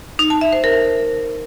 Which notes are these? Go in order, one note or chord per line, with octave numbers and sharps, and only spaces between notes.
D#4
A5
E5
C5
A#4